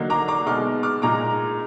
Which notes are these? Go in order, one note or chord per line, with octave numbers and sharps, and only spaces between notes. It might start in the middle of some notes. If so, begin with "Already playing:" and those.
Already playing: D3 F#3 A#3 D#4
A#5 D6
A#5 D6
B2 G#3 D#4 D6 F6
D6 F6
A#2 G#3 D#4 A#5 D6